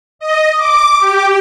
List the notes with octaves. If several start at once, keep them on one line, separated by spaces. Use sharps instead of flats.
D#5
D6
G4